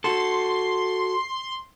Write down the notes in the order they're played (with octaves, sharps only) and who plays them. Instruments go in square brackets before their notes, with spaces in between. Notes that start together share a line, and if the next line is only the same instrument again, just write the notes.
[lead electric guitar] F#4 A4 [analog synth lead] C6